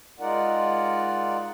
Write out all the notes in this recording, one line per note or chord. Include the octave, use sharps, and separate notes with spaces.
G#3 D#4 F4 A#4 D5 F#5